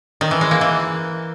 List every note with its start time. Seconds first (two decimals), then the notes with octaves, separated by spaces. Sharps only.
0.21 D#3
0.31 E3
0.41 G#3
0.51 A#3
0.61 E3